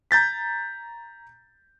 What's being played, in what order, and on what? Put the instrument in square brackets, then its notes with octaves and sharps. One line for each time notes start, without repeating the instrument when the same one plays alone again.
[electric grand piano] A#5 G6 A6 B6